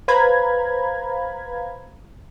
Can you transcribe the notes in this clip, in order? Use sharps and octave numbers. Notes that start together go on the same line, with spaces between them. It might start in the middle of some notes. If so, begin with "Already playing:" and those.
B4 C5 F5 A#5 B5 G#6